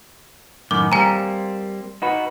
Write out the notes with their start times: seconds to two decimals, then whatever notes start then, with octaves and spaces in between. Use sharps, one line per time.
0.71 F#2 A2 D#3 D6
0.92 G3 A#3 C4 G#5 A#5
2.02 D#4 F#4 B4